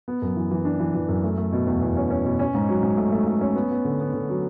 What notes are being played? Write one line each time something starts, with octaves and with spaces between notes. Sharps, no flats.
B3
F#2
E3
E3
D4
E3
E3
F#2
A3
A3
B2
E2
E2
C#4
C#4
B2
C#4
G#2
F#3
G#2
A3
A3
A3
C#4
B3
B3
D3
B3
D3
F#3